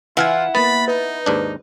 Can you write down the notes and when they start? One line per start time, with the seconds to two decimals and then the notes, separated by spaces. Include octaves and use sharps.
0.17 E3 E4 F4 F5 F#5 G#5
0.55 A#3 B3 B5 A6
0.88 D#4 B4
1.26 D#2 G#2 D4